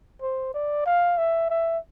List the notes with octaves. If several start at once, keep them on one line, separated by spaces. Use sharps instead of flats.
C5
D5
F5
E5
E5